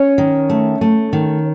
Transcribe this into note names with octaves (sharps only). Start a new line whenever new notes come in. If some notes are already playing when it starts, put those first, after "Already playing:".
Already playing: C#4 C#5
D#3
A3
A3
D#3